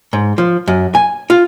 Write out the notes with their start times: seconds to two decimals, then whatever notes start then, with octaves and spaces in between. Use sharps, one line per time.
0.13 G#2
0.38 F3
0.68 F#2
0.95 G#5
1.30 F4